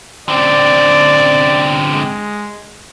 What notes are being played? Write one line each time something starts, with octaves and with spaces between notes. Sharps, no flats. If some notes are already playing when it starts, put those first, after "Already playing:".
D3 C4 D5
G#3